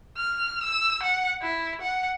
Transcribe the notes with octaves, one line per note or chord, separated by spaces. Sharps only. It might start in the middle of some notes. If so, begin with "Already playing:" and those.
F6
E6
F#5
E4
F#5